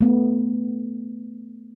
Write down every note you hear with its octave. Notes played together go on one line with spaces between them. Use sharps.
A3 B3